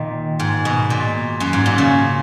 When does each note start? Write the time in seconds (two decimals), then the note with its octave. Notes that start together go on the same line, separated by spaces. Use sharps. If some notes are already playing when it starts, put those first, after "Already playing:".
Already playing: A#2 D#3
0.39 G#2
0.65 B2
0.90 A#2
1.40 F#2
1.53 G#2
1.66 A#2
1.78 C#3